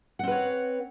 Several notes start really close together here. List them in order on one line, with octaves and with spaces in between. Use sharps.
F#5 C4 B4 C#5